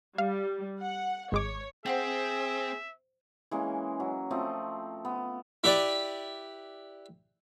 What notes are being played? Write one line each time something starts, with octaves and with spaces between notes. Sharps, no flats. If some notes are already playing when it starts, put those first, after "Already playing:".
G3 F5
F#5
G#1 G#3 C#5 D6
C4 G#4 C5 E5 F#5 G5
E3 G#3 A#3 C#4
F#3
F3 A3 C4 D#5
B3
E4 G4 B4 D5